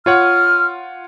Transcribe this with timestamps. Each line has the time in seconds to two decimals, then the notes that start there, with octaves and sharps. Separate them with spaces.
0.06 F4 C#5 F#5 F6